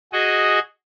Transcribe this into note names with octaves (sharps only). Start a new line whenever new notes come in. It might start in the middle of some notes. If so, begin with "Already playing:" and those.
F#4 G#4 D#5